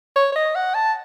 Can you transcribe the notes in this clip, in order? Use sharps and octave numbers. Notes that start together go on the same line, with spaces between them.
C#5
C#5
D#5
F#5
A5